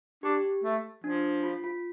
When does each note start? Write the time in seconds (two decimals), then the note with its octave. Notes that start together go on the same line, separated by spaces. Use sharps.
0.23 D4 G4
0.64 A3
1.04 F3 D4
1.43 F4
1.64 F4